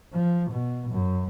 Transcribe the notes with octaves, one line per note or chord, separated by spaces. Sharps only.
F3
B2
F#2